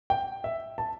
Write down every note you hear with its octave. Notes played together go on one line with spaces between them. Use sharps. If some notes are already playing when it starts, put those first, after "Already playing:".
G5
E5
A5